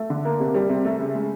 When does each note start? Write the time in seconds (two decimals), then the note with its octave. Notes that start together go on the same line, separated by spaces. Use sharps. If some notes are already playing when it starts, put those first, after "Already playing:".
Already playing: A3
0.10 D3
0.25 A#3
0.40 C3
0.54 G3
0.69 C3
0.85 A3
1.00 C#3
1.15 G#3